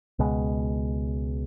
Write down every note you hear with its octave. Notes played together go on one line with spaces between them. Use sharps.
C#2 B2 G#3